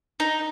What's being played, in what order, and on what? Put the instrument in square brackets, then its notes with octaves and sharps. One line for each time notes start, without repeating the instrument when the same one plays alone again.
[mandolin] D#4